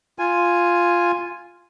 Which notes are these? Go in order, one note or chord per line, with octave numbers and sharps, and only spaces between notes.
F4 G#5